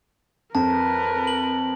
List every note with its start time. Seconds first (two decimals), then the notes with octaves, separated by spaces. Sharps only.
0.55 F2 A#4 B4 A5
1.27 F#7